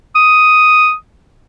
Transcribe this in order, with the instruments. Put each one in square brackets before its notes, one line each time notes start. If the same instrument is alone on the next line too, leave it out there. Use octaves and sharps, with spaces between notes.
[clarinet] D#6